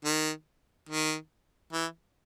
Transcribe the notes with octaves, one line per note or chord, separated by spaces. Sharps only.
D#3
D#3
E3